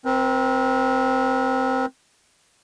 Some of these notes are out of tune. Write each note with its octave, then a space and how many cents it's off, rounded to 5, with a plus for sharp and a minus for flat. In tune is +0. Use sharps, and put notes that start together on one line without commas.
C4 +0 A#4 +45